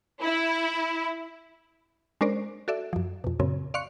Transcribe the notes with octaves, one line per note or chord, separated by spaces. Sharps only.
E4
G#3 C#4 D4 A#4 C5 D5
F#4 A4 D5 E5
F#2 F3
F2 B2
F#2 A#2 C#3 C4
D5 F5 C6 C#6 F#6 C#7